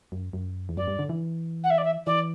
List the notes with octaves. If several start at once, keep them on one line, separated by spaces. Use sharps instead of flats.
F#2
F#2
E2
F#2 D5
G2
D3
E3
F#5
E5
D5
E5
E3 D5